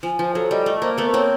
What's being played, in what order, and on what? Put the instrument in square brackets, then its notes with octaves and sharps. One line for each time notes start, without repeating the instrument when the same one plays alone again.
[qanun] F3 [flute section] G#5
[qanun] F3 [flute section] C5
[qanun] F#3 [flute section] A4
[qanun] G3 [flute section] D#5
[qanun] A3 [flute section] D#5
[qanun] A#3 [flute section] C5
[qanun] A3 B3 [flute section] A#4
[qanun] A#3 C4 [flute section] C#5